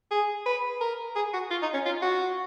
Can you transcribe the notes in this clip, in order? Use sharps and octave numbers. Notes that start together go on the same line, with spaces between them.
G#4
B4
A#4
G#4
F#4
F4
D#4
C#4
F4
F#4